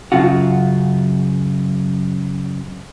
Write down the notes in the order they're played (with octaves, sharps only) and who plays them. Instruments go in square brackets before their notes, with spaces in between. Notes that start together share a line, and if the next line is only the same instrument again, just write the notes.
[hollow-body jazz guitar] F#2 C#3 F4 F#4